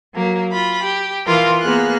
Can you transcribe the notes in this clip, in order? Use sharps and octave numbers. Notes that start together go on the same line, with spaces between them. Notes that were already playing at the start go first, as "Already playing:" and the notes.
F#3 A#3
F4 B5
G4
E3 F4 A#4 F5
A#3 B3 G#4 F6 F#6